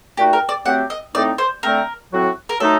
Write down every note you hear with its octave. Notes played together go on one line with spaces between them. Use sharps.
A#2 A3 D#4 F#4 G4
A#4
D5
F#3 A3 C4 G4 F#5
D#5
A2 A3 C4 D#4 D5
C5
D3 A3 C4 A#4
A2 F#3 C4 F#4
A#4
F#3 A3 D#4 A4